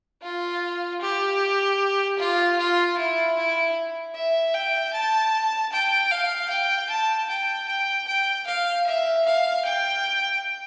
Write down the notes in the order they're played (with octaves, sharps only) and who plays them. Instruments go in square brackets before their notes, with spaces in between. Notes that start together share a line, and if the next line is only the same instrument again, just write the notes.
[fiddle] F4
G4
F4
F4
E4
E4
E5
G5
A5
G5
F5
G5
A5
G5
G5
G5
F5
E5
F5
G5